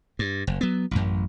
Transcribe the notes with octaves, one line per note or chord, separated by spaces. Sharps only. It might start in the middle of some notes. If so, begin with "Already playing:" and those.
G2
F#1
F#3 B3
A1 F#2